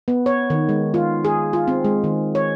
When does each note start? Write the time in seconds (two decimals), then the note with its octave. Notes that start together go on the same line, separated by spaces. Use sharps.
0.08 B3
0.26 C#5
0.50 D#3
0.69 G#3
0.94 F4
1.25 G#4
1.53 F4
1.67 C4
1.85 G#3
2.04 D#3
2.35 C#5